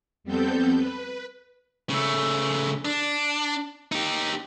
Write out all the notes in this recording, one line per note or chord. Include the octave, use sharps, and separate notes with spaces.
F2 G3 B3 C4 A4 G6
B4
C#3 A3
D4
D#4 G4